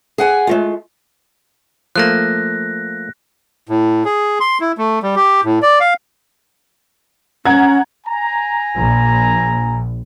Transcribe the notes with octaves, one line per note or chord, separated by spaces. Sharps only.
G#4 F#5 G#5
G#3 A3 F4
F3 A3 A#3 F#6 A#6
A2
G#4
C6
E4
A3
G3
G4
A2
D5
F5
C#4 F#5 A#5 G#6
G#5 A#5
A#1